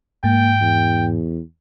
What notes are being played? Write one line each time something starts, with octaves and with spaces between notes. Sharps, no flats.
G#2 A#3 G5
E2